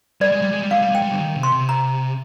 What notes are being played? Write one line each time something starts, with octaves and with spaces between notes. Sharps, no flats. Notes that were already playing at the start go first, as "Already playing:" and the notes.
G3 D5
G#3
G3
G#3
G3
G#3 F5
G3
G#3 G5
G3
D3
D#3
C3
C6
C3
A#5